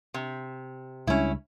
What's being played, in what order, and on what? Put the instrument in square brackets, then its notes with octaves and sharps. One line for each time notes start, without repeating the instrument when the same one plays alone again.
[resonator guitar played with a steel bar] C3
[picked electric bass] C#2 G3 G#3 [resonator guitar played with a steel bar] C#4 E4